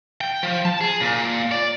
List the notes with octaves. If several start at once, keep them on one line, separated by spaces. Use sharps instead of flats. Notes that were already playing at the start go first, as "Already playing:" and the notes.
G5
F3
A5
G#4
A#2
D5